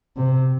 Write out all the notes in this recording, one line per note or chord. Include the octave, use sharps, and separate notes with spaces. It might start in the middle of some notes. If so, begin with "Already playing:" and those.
C3